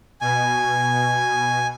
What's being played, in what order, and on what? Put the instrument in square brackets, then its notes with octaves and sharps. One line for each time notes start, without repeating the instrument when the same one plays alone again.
[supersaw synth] B2 [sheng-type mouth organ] G#5